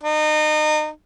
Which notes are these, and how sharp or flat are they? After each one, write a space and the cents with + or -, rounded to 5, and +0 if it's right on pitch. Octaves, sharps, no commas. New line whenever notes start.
D#4 -30